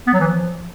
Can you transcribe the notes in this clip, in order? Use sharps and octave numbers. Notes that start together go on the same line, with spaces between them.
B3
F#3
E3
F3